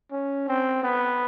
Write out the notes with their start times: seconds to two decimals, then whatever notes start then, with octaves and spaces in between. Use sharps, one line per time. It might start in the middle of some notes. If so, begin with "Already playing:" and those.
0.11 C#4
0.48 C4
0.83 B3